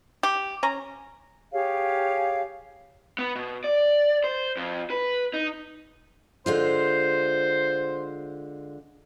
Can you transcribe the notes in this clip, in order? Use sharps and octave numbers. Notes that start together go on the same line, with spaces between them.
G4
C#4 A#5
G4 G#4 C#5 F5
B3
B2
D5
C5
F2
B4
D#4
D3 G#3 F4 C5